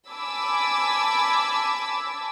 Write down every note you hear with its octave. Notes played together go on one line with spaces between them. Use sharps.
G#5 A5 B5 D6 E6